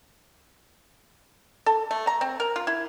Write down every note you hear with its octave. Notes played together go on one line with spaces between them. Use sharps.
A4
A3
A#5
C4
A#4
F4
E4